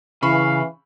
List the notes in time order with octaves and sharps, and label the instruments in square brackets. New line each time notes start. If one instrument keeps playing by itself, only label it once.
[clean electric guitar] C#3 [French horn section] E3 [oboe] F5 [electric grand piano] B5 C#6